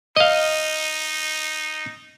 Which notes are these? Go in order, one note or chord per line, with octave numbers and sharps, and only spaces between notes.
D#4 D#5 F5